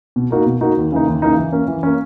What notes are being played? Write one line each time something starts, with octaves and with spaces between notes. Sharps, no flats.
B2
A#3 D#4 F#4 A#4
B2
A#3 D#4 F#4 A#4
D#2
C#3 E3 A#3 D#4
D#2
C#3 E3 A#3 D#4
E3
A#3 C#4
E3
A#3 C#4